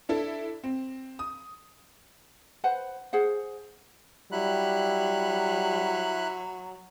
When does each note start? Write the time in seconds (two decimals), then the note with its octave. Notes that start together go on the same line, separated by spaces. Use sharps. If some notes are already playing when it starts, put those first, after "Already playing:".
0.09 D4 E4 A4
0.64 C4
1.19 D#6
2.64 B4 C5 F#5
3.13 G#4 C5 F#5
4.32 F#3 G3 E4 B5 F#6